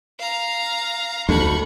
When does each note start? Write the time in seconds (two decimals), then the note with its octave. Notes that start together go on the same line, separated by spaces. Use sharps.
0.19 F5 A#5
1.29 D2 G#2 D3 B5 C#6